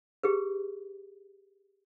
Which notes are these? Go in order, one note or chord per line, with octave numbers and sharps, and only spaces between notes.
G4 G#4 B4